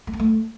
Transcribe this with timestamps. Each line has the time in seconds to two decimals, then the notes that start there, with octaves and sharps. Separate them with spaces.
0.07 A3
0.13 A#3
0.19 A3